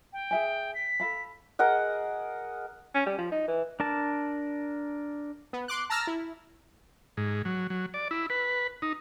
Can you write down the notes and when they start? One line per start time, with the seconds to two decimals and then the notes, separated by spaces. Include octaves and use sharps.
0.12 G5
0.31 G#4 E5 G#5
0.74 B6
1.00 A4 F5 B5
1.59 G#4 A#4 D#5 F#5
2.95 C#4
3.06 G3
3.18 F3
3.31 D#4
3.48 E3
3.80 D4 A#4 A5
5.53 B3
5.68 C6 D6 F#6
5.90 A5 A#5 E6 F6 A#6
6.07 E4
7.17 G#2
7.45 F#3
7.70 F#3
7.94 D5
8.11 E4
8.30 B4
8.82 D#4